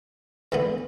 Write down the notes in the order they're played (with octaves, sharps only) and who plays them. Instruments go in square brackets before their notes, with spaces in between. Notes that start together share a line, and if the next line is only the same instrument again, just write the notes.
[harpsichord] E2 D3 B3 E5